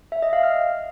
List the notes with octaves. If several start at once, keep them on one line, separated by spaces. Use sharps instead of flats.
E5
D#5
F5
F6